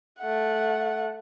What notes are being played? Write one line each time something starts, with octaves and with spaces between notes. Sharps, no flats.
A3 F#5